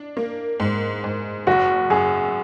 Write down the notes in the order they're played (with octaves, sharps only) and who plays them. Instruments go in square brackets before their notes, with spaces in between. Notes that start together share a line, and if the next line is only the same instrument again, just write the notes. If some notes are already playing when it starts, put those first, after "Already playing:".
Already playing: [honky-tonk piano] D4
A#3
G#2
G#2
[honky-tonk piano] F#1 [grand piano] F#4
[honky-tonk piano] F#2 [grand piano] G#4